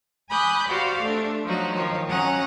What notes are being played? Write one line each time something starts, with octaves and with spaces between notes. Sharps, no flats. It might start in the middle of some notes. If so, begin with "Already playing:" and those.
G#5 B5 D6 D#6 F#6 G6
F#4 G4 C5 D5 F5
A3 D4
F3 F#3 D#4 F#4
D#3 F3 C#5
F#3 C#4 F#5 A#5 D#6